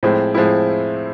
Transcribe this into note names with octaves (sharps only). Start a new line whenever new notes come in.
A2 F3 G#3 C4 E4
A2 F3 G#3 C4 E4